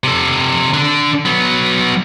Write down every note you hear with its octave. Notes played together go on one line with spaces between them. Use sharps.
C3 A4
D3 D4
F#3 B3